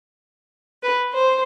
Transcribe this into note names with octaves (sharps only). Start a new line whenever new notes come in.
B4
C5